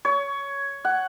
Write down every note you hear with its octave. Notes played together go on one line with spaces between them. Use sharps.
C#5
F#5